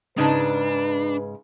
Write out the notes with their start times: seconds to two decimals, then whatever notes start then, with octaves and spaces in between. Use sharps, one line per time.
0.18 G#2 C#3 G#3 D4 D#4 B4 A5